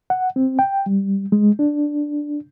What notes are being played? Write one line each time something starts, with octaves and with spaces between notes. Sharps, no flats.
F#5
C4
G5
G3
G#3
D4